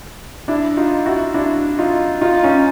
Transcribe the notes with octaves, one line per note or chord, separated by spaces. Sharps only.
D4 E4
D#4 F4
E4 F#4
D4 E4
D#4 F4
D#4 F4
C#4 D#4